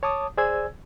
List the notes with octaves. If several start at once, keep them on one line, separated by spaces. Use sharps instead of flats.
C#5 A5 D6 D#6
G#4 C5 D5 G#5 E6 G#6